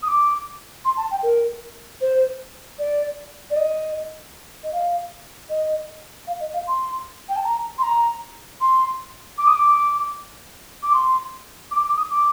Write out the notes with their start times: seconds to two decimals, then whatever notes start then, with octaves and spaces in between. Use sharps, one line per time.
0.03 D#6
0.08 D6
0.85 C6
0.97 A5
1.11 G5
1.23 A#4
2.01 C5
2.79 D5
3.50 D5
3.56 D#5
4.64 D#5
4.73 F5
5.50 D#5
6.27 F5
6.40 D#5
6.54 F5
6.67 C6
7.29 G5
7.36 A5
7.44 A#5
7.78 C6
7.83 A#5
8.61 C6
9.38 D6
9.47 D#6
9.55 D6
10.83 D6
10.93 C6
11.71 D6
11.84 D6
11.97 D#6
12.10 D6